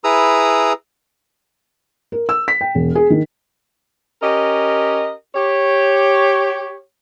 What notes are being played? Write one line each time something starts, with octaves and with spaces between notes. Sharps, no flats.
E4 G#4 B4 A#5 D#6 E6
A#4
E6
B6
G5
E1
G#4
D#3
C#4 G4 A#4 D#5
G4 C#5